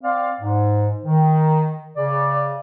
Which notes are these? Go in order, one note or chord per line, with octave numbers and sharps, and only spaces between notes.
C4 D5 F5
G#2
D#3
C#3 D5